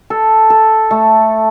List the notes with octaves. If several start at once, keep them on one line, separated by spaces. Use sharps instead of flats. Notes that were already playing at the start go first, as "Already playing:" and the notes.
A4
A4
A3